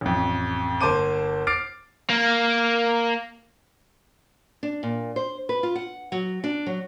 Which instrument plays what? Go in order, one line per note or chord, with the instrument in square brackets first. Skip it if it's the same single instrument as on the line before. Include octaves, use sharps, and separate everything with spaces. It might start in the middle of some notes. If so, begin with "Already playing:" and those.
[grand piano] A1 F2
G1 A#3 C5 A5 D6 D#7
D6 F6 A6 C7 D7
[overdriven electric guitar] A#3
[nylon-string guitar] D4
A#2
C5
B4
F4
F#5
F#3
D4
F#3